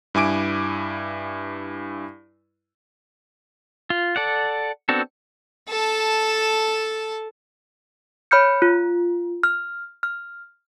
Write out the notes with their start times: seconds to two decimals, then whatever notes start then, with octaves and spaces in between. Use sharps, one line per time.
0.15 G2 E4 G#5 D6 D7
3.90 F4
4.16 A4 D5 F#5
4.89 B3 C4 D4 F#4 A4
5.69 A4 A5
8.31 C#5 B5 F6 G6 C#7
8.62 F4
9.43 F6
10.03 F6